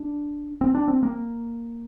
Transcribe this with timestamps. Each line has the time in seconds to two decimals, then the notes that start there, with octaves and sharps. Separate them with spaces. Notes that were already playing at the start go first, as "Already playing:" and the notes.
Already playing: D4
0.61 C4
0.75 D4
0.88 C4
1.03 A#3